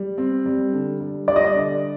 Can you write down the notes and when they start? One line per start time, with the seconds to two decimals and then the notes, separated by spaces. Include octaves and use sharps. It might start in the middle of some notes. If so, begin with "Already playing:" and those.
Already playing: G3
0.18 C4
0.46 G3
0.73 D3
1.00 G3
1.28 G3 D5
1.36 D#5
1.45 D5
1.56 D3